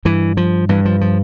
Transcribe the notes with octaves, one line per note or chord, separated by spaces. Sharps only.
G2 E3
F3
G2 E3
F3
F3